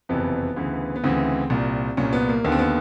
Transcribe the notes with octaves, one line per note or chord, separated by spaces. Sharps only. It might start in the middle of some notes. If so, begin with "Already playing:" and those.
F#1 F2 C3 E3 B3
D2 C#3 E3
B3
D2 C#3 E3 C4
C2 A#2
C2 A#2 C#4
B3
A#3
D#2 D3 B3
C4
B3